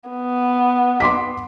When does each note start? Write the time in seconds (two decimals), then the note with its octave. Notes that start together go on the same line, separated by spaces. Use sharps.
0.10 B3
1.00 C6 D6 B6